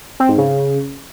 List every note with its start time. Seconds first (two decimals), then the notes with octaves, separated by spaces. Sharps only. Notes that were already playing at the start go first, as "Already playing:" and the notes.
0.20 C4
0.29 G#2
0.38 C#3